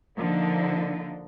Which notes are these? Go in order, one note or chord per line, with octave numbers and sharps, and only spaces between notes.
D3 F3 A#3 D4 D#4